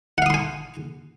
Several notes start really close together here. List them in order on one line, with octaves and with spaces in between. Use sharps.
F#5 F5 D#6 C6 G#5